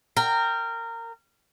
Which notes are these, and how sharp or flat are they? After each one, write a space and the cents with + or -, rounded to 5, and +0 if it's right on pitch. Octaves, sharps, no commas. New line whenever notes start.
A#4 -20 G5 +0